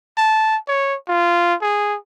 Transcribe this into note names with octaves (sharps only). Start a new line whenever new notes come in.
A5
C#5
F4
G#4